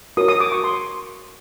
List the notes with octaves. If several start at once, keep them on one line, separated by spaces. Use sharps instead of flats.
F#4 A#4 C#5 D#6
D#6
D6
C#6
C6